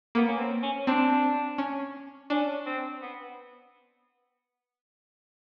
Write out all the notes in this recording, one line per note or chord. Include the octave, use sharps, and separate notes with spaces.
A#3 B3
C#4
C4
C#4
C4 D4
C#4
C#4 D4
C4
B3